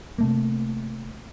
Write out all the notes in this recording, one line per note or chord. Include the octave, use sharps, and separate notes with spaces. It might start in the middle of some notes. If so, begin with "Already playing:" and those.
C3 A3 A#3